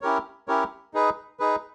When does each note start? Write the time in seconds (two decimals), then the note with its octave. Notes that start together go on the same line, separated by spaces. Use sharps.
0.01 C#4 E4 G4 A#4 C#5
0.48 C#4 E4 G4 A#4 C#5
0.94 D#4 G#4 B4
1.40 D#4 G#4 B4